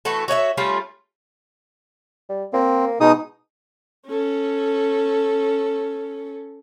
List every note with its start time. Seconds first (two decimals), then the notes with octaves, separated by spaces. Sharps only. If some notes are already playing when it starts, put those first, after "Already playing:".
0.05 E3 A3 F#4 A4
0.28 F#4 C#5 D#5 E5
0.57 G3 A3 C#4 F4
2.29 G3
2.53 A#3 C4
3.01 B2 G#3 D#4 D#6
4.07 C#4 A4